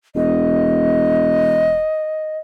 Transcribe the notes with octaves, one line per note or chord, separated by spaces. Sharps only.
E1 D#5